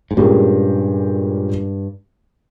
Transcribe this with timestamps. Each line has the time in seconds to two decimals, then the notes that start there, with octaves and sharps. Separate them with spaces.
0.11 G#2
0.17 G2 A#2 G#3 C#4 G4 A#4